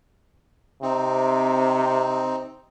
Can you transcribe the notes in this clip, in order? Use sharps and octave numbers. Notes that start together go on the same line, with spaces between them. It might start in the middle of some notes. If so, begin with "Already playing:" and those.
C3 C4 D#4